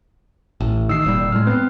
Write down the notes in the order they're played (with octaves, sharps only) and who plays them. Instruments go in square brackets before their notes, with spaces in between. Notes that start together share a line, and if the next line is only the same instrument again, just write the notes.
[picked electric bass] A1
[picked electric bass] D#3 [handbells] E6 C7
[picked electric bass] F1 A#2 G3
[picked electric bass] A2 G#3 [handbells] F6
[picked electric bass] B3 C4 [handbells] B4